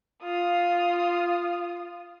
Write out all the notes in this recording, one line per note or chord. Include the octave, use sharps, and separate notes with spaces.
F4 D#6